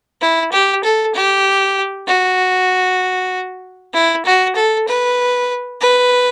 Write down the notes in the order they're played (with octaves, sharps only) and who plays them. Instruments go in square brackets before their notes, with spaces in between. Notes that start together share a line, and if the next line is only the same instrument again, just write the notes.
[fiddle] E4
G4
A4
G4
F#4
E4
F#4
A4
B4
B4